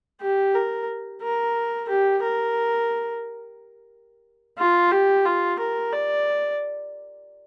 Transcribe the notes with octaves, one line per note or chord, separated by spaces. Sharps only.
G4
A#4
A#4
G4
A#4
F4
G4
F4
A#4
D5